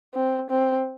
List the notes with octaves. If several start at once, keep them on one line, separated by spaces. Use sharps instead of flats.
C4
C4